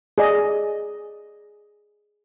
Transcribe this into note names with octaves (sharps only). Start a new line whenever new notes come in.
G#4 D5 D#5